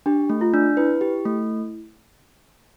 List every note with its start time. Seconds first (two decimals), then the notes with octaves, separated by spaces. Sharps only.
0.06 D4 G4
0.30 A3
0.41 F4
0.54 D4
0.77 E4 B4
1.01 G4
1.25 A3